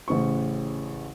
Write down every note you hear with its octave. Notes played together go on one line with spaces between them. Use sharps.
A1 C#3 C5 C#6